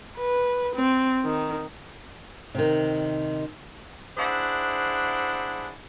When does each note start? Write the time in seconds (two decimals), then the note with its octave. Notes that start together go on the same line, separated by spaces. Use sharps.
0.18 B4
0.76 C4
1.25 D#3
2.55 C3 D#3
4.17 D4 E4 G#4 C5 F#5